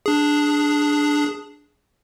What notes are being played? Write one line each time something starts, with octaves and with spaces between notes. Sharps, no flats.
D4 G#4